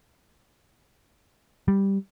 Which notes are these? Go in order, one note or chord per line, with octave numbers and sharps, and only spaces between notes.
G3